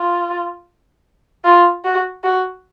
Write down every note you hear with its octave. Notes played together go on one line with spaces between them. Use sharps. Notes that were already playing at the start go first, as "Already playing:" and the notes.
Already playing: F4
F4
F#4
F#4